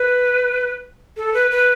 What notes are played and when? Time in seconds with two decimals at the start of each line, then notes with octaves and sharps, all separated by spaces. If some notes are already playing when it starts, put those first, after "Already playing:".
Already playing: B4
1.17 A4
1.34 B4
1.51 B4